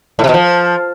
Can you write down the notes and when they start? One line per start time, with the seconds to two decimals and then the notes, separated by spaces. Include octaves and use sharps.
0.19 A2
0.24 C3
0.29 B2
0.34 F3